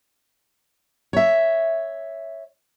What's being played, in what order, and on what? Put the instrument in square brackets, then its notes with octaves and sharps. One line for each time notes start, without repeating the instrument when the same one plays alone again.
[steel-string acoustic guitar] C#5 E5